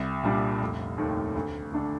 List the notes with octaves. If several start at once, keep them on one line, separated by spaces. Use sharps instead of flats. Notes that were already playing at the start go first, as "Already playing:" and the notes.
Already playing: C2
A#2 G3 D4
F1
D#2 D#3 A3
D2
D3 A3 D4 A4